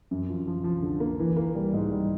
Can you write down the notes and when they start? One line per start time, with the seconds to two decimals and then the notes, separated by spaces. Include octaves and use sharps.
0.11 F#2
0.29 F3
0.47 F3
0.64 F3
0.82 D3
1.00 A#3
1.20 E3
1.37 A#3
1.55 G3
1.73 G#2
1.91 G3